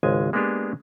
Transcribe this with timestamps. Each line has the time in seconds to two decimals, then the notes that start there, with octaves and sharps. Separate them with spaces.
0.03 G#1 C#2 G#3 G#5
0.33 G#3 A#3 B3 D4 G4 G#4